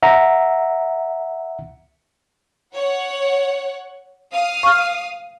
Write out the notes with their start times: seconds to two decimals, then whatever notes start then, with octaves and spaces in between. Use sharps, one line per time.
0.03 E5 F#5 A#5
2.74 C#5 F#5
4.33 F5 D#6
4.63 C#6 F6